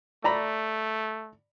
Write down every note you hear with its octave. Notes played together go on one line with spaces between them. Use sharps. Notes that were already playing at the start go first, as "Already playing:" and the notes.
A3 D5 A#5 B5